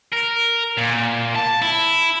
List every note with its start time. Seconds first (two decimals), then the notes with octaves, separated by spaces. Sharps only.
0.12 A#4
0.77 A#2
1.35 A5
1.62 E4